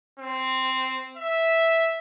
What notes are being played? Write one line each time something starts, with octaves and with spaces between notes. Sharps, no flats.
C4
E5